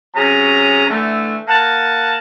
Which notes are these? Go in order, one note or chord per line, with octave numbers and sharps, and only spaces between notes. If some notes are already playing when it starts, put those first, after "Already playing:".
C3 F#3 C#4 G#4 A#5
D3 E3 A3
A#3 F#5 A5